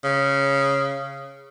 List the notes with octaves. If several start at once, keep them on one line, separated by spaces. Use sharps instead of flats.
C#3